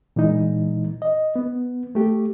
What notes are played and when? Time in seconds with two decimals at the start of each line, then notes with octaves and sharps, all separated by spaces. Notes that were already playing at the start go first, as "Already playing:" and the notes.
0.16 A#2 E3 G#3 D#4
1.02 D#5
1.36 B3
1.95 A3 G4